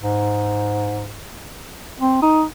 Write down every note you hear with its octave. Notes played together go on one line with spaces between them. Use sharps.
G#2
C4
D#4